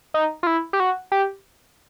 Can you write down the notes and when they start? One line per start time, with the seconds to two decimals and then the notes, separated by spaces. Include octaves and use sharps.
0.14 D#4
0.43 F4
0.47 E4
0.73 G4
0.80 F#4
1.12 G4